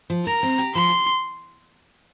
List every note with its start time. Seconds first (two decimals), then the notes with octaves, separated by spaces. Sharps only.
0.10 F3
0.26 A#4 A#5
0.43 C4
0.59 G4
0.75 F3 C6